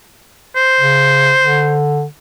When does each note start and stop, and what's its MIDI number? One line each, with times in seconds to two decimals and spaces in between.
0.56 1.78 72
0.80 1.34 49
1.40 2.04 50